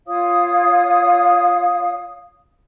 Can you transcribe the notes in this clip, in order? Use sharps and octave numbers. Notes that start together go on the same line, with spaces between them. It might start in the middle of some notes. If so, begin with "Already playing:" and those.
F4 C#5 F5 D#6